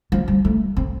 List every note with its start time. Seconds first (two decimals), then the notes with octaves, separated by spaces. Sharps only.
0.12 F3
0.28 G3
0.45 A3
0.77 C4